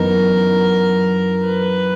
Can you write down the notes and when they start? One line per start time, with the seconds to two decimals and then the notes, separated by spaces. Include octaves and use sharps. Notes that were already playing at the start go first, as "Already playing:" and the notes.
Already playing: F#2 E3 B3 D#4 A#4
1.45 B4